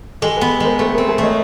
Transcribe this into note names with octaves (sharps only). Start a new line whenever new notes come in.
G#3 G4 A4
A4 B4
B3
G#3 A#4 C5
A3 A4 B4
C4 G#4 A#4
G#4 A#4
A3 C#5 D#5